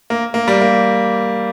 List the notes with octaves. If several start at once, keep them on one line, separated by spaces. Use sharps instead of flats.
A#3
A#3
G3
A#3